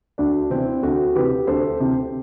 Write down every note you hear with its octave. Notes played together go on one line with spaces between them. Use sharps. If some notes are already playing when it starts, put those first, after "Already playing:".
D2 D4 F#4
C3 E3 C4 E4
D2 F#4 A4
C3 E3 G4 B4
D2 A4 C5
C3 E3